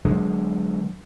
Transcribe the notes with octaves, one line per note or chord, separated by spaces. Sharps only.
D3 F#3 G#3 D4